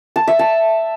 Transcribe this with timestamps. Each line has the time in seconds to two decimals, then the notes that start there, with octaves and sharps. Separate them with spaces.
0.16 A5
0.27 E5
0.39 A5